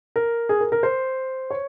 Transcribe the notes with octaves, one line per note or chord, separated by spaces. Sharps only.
A#4
G#4
A#4
A#4
C5
C#5